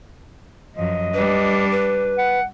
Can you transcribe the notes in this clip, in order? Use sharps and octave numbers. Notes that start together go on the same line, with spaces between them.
F#2 F3 D#5
G3 D4 B4
B4
F#5